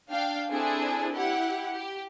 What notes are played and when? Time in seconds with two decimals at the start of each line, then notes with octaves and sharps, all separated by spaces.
0.10 D4 F5 G5
0.51 C4 D4 E4 G#4 A4
1.12 E4 G4 F#5
1.73 G4